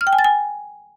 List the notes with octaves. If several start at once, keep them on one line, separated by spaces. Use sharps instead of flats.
F6
G5
G#5
A6
G#5